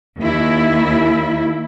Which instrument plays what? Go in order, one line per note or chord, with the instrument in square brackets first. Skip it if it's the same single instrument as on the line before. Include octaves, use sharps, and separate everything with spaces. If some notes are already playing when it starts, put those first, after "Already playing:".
[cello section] D#2 E4